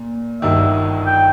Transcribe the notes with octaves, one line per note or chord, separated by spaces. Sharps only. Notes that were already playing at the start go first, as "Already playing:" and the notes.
Already playing: A#2
G1 G2 D#3 E5
G5